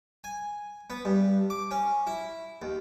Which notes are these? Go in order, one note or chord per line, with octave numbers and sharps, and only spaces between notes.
G#5
B3
G2
D6
C#4
E4
D#2